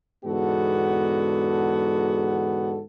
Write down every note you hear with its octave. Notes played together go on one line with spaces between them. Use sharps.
E2 G#2 D3 B3 F#4 A4